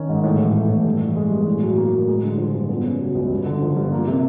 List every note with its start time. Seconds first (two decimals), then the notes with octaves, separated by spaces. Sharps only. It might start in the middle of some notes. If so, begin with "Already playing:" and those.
Already playing: D#3 C#4
0.09 G#2
0.23 A2
0.39 E3
0.55 A3
0.69 A2
0.85 G2
1.01 E3
1.16 G#3
1.31 G2
1.47 A2
1.62 F#3
1.77 A#3
1.93 A2
2.08 G#3
2.23 D3
2.38 F3
2.54 G2
2.69 B3
2.84 C#3
3.00 F#3
3.15 C#2
3.31 G2
3.45 D3
3.62 F3
3.76 G2
3.92 A#3
4.07 C3